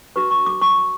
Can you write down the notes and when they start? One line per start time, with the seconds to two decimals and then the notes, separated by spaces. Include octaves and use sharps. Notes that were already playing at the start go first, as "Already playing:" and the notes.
0.16 D4 F#4 B4 C#6
0.31 C#6
0.46 D6
0.61 C#6